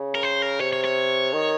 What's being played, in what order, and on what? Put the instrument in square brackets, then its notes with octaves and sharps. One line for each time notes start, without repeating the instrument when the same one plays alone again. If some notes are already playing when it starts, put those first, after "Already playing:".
Already playing: [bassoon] C#3
[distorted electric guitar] A#4
C5
A#4
[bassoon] C3 [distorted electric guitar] C#5
[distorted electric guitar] C#5
C#5
[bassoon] D#3